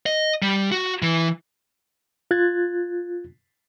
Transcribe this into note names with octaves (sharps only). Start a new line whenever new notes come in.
D#5
G3
F#4
E3
F4 F#6 G#6 A6